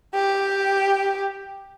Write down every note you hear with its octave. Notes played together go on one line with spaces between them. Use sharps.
G4